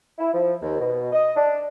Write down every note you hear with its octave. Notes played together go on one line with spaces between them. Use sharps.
E4
F3
D#2
B2
D#5
D4